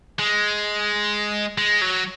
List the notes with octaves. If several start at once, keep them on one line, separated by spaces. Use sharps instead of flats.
G#3
G#3
F#3